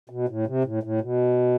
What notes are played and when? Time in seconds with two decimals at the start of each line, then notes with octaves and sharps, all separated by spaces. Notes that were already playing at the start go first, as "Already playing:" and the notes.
0.10 B2
0.29 A2
0.47 C3
0.64 A2
0.83 A2
1.01 B2